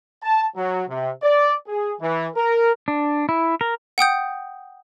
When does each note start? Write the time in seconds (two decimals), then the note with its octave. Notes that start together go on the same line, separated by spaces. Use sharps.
0.23 A5
0.56 F#3
0.89 C3
1.23 D5
1.68 G#4
2.01 E3
2.36 A#4
2.88 D4
3.29 E4
3.61 A#4
3.98 F#5 G5 D#6 G6